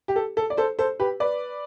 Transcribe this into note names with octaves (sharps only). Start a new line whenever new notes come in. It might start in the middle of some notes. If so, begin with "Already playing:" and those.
G4
A4
A4
D5
A4 C5
A4 C5
G4 B4
B4 D5